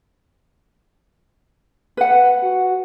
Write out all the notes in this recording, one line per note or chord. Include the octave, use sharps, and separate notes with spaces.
B4 F#5
F#4